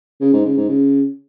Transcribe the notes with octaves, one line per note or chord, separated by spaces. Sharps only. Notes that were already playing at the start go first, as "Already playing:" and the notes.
C#3
G#2
C#3
G#2
C#3